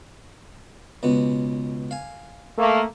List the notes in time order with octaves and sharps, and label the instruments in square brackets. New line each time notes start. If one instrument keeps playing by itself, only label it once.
[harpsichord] C#2 B2 B3
F5 G#5
[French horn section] A3 A#3